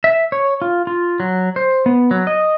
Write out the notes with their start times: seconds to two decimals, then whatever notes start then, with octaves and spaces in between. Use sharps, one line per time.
0.04 E5
0.32 C#5
0.62 F4
0.87 F4
1.20 F#3
1.56 C5
1.86 B3
2.11 F#3
2.27 D#5